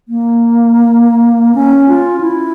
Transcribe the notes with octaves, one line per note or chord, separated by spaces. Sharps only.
A#3
C#4
F4
E4